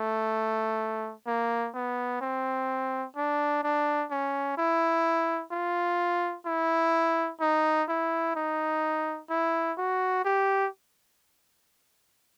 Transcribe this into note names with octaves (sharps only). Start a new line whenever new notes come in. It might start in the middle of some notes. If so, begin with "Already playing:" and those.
Already playing: A3
A#3
B3
C4
D4
D4
C#4
E4
F4
E4
D#4
E4
D#4
E4
F#4
G4